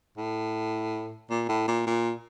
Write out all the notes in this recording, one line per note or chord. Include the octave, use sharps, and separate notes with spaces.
A2
A#2
A2
A#2
A#2